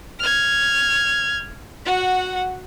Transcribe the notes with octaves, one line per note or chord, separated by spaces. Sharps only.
F6 G#6
F#4 F#5